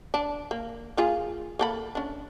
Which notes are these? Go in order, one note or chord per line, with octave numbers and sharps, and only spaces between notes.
D4
A#3
A#3 F4 G#4
A#3 A4 B5
C#4 D4